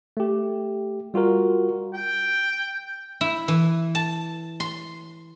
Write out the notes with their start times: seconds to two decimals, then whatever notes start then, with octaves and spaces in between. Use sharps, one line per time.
0.17 A3 G4
1.14 G3 F4 F#4 A#4
1.94 G5
3.21 E4
3.48 E3
3.95 A5
4.60 C6